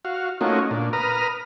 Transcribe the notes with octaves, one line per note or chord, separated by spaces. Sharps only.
F#4 F5
A3 A#3 C#4 D#4 F4 F#4
A#2 D4
A#4 B4 A#5 D#6 F6